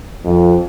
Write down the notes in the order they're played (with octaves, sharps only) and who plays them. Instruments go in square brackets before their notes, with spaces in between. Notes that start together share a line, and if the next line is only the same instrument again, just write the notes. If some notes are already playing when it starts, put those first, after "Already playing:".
[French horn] F2